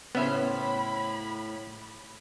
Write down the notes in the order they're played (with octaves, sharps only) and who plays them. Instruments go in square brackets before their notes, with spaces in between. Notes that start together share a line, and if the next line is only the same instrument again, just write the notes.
[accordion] A2 [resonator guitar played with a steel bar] C#3 C#4 C5 [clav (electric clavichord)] B3 E5 [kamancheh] B5